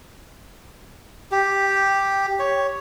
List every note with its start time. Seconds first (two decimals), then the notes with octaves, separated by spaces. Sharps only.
1.32 G4
2.39 C#5